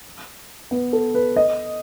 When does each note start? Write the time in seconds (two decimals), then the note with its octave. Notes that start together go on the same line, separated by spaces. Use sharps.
0.71 B3
0.93 A4
1.15 B4
1.36 D#5